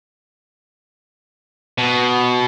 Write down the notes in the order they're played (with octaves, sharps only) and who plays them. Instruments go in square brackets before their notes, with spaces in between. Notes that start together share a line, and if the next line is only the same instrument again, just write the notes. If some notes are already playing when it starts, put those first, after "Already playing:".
[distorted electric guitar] B2